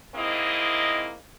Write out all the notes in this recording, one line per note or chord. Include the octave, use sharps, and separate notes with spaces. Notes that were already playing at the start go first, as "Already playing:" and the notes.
G#2 A#3 C4 E4 D#5